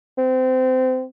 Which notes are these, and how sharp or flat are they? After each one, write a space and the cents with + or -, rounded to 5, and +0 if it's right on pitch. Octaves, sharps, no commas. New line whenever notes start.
C4 -25